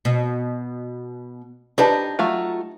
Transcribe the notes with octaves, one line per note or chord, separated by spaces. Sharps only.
B2
D4 D#4 G4 B4 A5
F#3 A3 F4